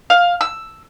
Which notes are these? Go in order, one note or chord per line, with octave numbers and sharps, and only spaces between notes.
F5
E6